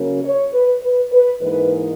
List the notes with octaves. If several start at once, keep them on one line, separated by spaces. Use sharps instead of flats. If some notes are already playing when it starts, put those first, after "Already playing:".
Already playing: C#3 F#3 A#3 C#4
C#5
B4
B4
B4
G#2 E3 A#3 D#4 B4